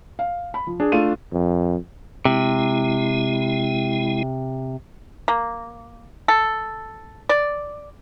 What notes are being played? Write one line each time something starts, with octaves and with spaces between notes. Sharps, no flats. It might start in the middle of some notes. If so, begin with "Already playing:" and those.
F5
B5
F3
D4 G#4
A3 F4 D#7
F2
C3 G#3 E4
A#3
A4
D5